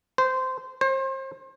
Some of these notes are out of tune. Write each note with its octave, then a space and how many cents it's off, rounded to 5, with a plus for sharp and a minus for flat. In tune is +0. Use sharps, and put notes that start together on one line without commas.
C5 -15
C5 +35